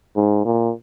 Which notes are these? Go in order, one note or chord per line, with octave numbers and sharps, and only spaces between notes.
G#2
A#2